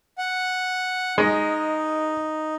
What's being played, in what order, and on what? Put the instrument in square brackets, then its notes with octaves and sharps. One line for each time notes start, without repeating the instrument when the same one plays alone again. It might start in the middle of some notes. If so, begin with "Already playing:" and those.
[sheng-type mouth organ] F#5
[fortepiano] G#3 [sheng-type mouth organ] D#4